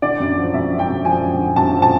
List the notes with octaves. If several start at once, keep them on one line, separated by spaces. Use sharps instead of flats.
D3 D5
F#2
F3
F#2 E5
D3
G5
F#2
F3 G#5
F#2
D3
F#2 A5
F3
A5